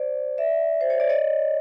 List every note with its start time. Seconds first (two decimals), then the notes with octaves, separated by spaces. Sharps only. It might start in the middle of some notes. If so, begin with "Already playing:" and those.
Already playing: C5 D5
0.38 D5 E5
0.81 C5
0.90 C#5
1.00 D5
1.09 C#5 D#5